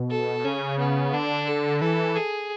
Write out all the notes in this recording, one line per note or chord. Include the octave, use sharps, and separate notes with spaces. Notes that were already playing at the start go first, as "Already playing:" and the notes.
Already playing: B2
A4
C#3 C#4
B3
D3 D4
A4
E3 A4
G#4